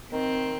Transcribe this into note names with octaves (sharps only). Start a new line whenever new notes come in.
D#3 C4